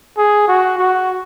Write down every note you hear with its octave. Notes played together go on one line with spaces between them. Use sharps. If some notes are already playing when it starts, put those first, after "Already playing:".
G#4
F#4
F#4